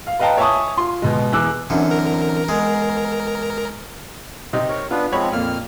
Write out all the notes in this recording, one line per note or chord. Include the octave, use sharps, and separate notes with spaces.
F5
B4 D#5 F5 G5 A5 A#5
C#5 E5 G#5 A5 C#6 D#6
F4 C6
B2 G#3
E2 G#4 D6 E6 F#6
F#2 D3 E3 C4 C#4
A#4
G#3 B3
C3 D#4
A#4 C#5
B3 D4 F4 B4
F3 G#3 C4 C#5 B5
F2 A#2 A#3 F6